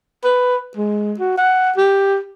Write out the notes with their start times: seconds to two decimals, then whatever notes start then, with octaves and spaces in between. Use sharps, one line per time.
0.24 B4
0.77 G#3
1.19 F#4
1.38 F#5
1.77 G4